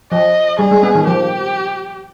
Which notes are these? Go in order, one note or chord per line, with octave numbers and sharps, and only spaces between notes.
F3 D#5
G3 G#4
G#3
B3
D#3
F3 G4